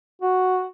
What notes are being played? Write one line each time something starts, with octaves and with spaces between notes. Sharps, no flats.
F#4